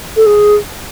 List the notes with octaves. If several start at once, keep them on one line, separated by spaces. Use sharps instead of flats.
A4
G#4